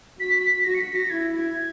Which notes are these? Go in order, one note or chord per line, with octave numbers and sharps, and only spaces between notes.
F#4 B6
B6
F#4 A#6
C#7
B6
A#6
E4 G#6